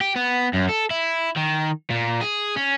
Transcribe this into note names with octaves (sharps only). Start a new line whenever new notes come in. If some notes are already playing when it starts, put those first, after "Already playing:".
G4
B3
F#2
A4
E4
D#3
A#2
G#4
C#4